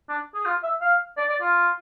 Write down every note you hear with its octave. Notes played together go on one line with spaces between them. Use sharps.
D4
G#4
F4
E5
F5
D5
D5
F4